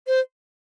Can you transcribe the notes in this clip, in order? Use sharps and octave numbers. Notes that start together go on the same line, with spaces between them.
C5